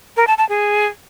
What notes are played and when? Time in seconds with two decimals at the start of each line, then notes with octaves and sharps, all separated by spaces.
0.17 A#4
0.27 A5
0.38 A5
0.49 G#4